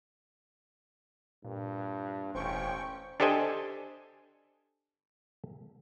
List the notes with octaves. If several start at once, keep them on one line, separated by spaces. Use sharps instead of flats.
G2 A#2
E1 A1 C#4 C5 G5 C#6
D4 G4 A4 C5 D#5 G#5